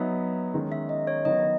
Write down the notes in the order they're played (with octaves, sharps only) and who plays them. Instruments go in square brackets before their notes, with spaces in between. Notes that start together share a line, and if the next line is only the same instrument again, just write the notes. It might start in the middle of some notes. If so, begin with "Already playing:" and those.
Already playing: [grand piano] F#3 B3 D#4 [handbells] E5
[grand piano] D#3 G#3 C#4
[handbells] E5
D#5
C#5
[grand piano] D#3 F#3 B3 [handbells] D#5